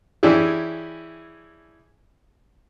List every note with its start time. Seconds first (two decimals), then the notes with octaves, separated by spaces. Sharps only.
0.23 E3 C#4 D4 E4 G4 G#4